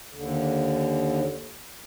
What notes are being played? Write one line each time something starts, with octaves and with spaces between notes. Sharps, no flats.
D#2 D3